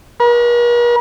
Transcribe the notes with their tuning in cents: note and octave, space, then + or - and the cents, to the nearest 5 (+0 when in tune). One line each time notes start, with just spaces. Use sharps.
A#4 +45